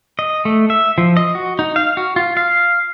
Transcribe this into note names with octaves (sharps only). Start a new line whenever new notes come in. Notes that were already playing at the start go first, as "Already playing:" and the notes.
D#5
A3
E5
F3
D#5
F#4
D#4
F5
F#4
F4
F5